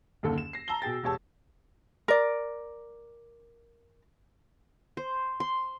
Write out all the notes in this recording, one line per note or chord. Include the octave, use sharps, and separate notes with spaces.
F#1 D#2 D3 A4
E7
A#6 C7
A5 A#5 E6 A#6 G7
B2 G#4 G5 A6
E1 G4 C#5 A5 E6
A#4 D5
C5
C6